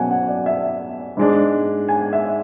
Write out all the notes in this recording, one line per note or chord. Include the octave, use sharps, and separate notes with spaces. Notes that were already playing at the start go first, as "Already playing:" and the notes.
Already playing: B2 F#3 C#4 F#5 G#5
F#5
D5
E5
G#2 G#3 D4
G#5
E5